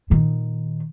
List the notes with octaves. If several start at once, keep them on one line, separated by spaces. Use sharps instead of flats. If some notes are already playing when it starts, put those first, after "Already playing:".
A#2 D#3